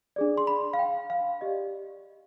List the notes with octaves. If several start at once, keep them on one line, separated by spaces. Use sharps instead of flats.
D4 G#4 D5
C6
B5
F5
G5
F5
G4 D5 D#5